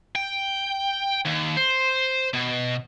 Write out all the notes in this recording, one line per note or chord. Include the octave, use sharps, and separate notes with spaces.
G5
D#2
C5
B2